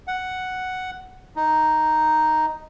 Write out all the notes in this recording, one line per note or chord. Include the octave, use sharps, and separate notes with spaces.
F#5
D#4